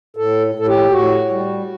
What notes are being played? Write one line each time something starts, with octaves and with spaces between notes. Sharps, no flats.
A2 A4
A2 A4
G4
A2 F#4
G3